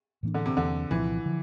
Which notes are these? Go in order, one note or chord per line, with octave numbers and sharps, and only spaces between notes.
A2 E3 A#3 D4
D3
C3
E2 D3 E3 A#3 D4
C2 A#2 E3 F3 C4
D3 F3